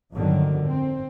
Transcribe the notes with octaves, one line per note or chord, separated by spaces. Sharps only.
G1 F2 A2 D3 D#3 F#3
C4